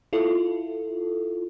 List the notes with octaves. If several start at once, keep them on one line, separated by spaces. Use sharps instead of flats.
E4 F4 A4